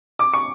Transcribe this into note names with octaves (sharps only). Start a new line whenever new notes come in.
D6
C#6